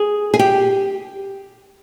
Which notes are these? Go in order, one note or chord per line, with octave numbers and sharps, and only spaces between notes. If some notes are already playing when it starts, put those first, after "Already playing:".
Already playing: G#4
G#4
G4